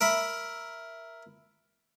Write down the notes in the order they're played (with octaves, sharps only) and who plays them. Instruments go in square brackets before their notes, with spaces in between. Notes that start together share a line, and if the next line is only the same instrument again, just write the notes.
[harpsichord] A#4 E5 B5